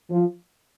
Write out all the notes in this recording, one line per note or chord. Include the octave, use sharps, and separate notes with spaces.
F3